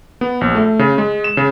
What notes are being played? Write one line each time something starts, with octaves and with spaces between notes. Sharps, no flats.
B3
A#1
A3
C#3
G#3
E7
C#3